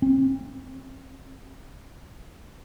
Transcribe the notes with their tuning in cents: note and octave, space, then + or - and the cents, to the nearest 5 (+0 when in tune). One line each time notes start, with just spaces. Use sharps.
C4 +45